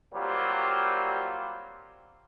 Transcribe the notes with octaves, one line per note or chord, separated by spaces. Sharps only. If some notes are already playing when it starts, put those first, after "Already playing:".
F#3 G3 A#3 C4 F4 G4